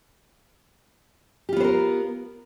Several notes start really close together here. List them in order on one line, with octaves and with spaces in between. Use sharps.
G4 F4 B3 C5 A#4